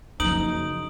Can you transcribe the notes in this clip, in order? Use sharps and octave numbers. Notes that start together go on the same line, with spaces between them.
F#1 F3 D#4 D#6 D7 F#7